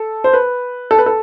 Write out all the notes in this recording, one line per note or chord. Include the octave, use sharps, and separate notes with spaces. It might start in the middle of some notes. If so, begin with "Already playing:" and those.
Already playing: A4
C5
B4
A4
B4
A4